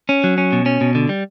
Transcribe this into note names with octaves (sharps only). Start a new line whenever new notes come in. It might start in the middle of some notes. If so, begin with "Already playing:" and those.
C#4
F#3
C#4
B2
C#4
B2
D3
G3